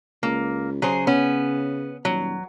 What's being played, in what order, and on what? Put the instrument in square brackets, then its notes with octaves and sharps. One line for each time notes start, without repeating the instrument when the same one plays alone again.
[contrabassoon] C#2 [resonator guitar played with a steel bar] A#3
[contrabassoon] C#3 [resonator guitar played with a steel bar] F#3 G#4 C5
[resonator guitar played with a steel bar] B3 C#4
[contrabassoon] D#1 [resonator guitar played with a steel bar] F#3